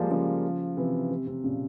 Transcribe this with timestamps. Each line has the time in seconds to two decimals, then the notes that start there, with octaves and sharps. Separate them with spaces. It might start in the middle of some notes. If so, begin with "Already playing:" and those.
Already playing: F3 G3 G#3 A#3
0.10 C#3 F3
0.77 C3 E3
1.11 C3
1.27 C3
1.44 A#2 C#3